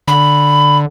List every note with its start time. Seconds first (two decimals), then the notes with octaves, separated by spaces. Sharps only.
0.08 D3 B5